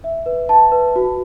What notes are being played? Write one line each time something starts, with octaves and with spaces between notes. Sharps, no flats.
E5
B4
A5
B4
F#4